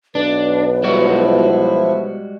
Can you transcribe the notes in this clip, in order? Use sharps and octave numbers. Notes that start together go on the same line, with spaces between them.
B1 D4 B4
F3 G3 G#3 E4 F#4